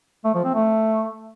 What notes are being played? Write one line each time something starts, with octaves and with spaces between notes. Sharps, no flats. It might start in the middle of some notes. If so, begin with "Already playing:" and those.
A3
F3
C4
A3